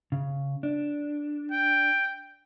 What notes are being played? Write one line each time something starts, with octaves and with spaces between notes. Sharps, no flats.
C#3
D4
G5